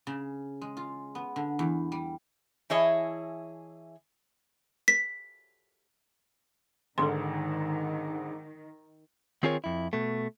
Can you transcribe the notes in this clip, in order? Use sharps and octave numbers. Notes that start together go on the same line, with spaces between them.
C#3
G#3
F4
B3
D3
E2
G3
E3 E4 G#4 C#5 D#5 A5
B6
G#1 G#2 D3 D#3 A4 C6
D#3 C4 F4 G#4 A#4 C#5
F2 E4
B2 A3